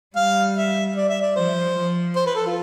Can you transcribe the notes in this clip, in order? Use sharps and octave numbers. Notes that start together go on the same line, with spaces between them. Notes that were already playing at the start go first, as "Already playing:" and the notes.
G3 F5
E5
D5
E5
D5
F3 C5
F3
C5
B4
A4
F4